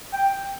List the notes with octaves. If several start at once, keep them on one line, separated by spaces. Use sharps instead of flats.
G5